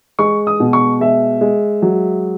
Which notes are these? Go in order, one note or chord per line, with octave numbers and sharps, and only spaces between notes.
G#3 C#6
D#6
B2
C#6
G#3 E5
G#3
F#3